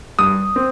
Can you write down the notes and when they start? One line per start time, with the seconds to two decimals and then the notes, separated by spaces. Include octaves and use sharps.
0.19 G2 D#6
0.56 C4